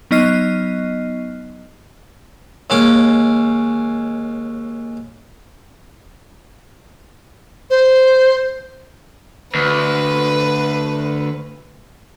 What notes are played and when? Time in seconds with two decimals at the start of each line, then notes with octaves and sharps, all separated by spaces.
0.11 F#3 B3 D#4 D#5 F6 C7
2.70 D#2 G#3 C#4 D6
7.70 C5
9.55 D2 B4